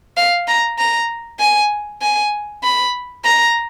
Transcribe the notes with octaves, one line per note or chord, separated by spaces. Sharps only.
F5
A#5
A#5
G#5
G#5
B5
A#5